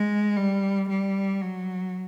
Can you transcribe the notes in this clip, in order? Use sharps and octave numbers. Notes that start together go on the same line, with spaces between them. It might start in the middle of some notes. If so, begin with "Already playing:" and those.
Already playing: G#3
G3
G3
F#3